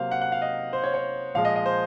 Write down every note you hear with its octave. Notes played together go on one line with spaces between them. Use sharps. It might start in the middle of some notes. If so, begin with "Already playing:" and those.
Already playing: C3 F#3 A#3 C5 F5
F#5
F#5
F5
D#5
C5
C#5
C#5
A#2 F3 G#3 F5
D#5
D#5
C5